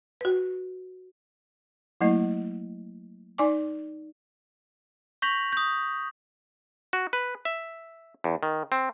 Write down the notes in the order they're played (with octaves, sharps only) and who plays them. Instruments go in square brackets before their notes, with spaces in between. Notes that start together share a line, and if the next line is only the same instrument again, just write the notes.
[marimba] F#4 B4
[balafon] F#3 A3 A#3 E4 D#5
D#4 D5 G#5 D6
[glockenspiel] C#6 G6 A#6 B6 F7 F#7
D#6 G6
[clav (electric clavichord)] F#4
B4
E5
E2
D#3
C4